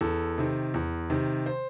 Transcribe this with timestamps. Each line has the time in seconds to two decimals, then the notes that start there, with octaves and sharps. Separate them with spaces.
0.01 E2 A4
0.38 C3 D#3
0.74 E2
1.10 C3 D#3
1.46 C5